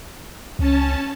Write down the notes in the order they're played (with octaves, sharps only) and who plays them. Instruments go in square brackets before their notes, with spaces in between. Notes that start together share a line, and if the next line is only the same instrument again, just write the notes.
[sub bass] C#2 [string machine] C#4 A5